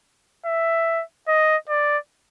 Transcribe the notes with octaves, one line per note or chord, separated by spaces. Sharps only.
E5
D#5
D5